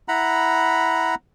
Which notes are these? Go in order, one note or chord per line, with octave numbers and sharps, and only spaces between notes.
E4 F#5 A#5 B5